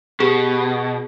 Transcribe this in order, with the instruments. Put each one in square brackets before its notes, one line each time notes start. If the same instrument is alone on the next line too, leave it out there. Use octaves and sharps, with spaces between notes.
[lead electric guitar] B2 [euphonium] G4 [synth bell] G#4